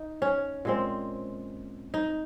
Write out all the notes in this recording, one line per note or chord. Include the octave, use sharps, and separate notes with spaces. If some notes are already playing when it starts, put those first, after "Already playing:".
Already playing: D#4
C#4
A#2 G#3 C4
D#4